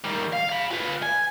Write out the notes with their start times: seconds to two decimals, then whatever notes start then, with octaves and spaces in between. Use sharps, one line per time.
0.04 D#3 G3
0.33 F5
0.49 F5 B5
0.71 F4 B4
1.03 G#5